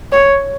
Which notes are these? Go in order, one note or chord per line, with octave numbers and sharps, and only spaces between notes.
C#5